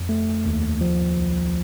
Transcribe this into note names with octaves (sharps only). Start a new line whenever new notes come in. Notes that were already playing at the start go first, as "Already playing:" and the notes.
Already playing: F2
A3
D#2
F3
C2